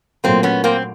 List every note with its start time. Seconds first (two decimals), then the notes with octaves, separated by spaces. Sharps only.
0.24 A#2 F#3 A3 A#3 C4
0.43 B3 C#4
0.64 A#3 C4